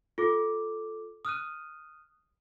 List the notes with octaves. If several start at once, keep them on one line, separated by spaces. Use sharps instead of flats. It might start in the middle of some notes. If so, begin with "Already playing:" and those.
F4 A4 D6
D#6 F6 F#6 D#7